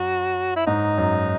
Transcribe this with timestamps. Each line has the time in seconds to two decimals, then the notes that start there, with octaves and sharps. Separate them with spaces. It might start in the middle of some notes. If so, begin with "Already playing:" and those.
Already playing: F#2 F#4
0.56 E4
0.67 G#2 D#4
0.98 F#2